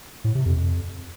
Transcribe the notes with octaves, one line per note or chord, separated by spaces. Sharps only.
A2
C3
F2
F2